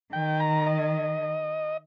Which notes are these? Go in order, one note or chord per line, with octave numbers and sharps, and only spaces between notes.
D#3 G5
A#5
D#5